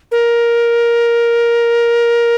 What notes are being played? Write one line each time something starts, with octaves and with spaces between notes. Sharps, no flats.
A#4